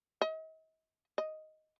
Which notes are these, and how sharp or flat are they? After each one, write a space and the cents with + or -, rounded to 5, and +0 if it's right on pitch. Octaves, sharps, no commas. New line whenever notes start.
D#5 +40
D#5 +5